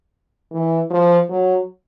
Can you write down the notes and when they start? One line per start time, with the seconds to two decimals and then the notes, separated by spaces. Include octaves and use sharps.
0.52 E3
0.91 F3
1.30 F#3